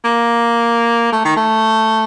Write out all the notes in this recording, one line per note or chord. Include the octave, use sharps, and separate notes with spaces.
A#3
A3
D#3
A3